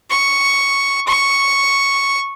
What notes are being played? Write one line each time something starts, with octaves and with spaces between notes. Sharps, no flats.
C#6
C#6